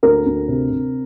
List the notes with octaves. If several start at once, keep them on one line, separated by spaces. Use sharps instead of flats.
D2 A#4
D2
C3
C3